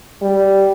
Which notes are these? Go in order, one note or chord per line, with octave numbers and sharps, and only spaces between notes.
G3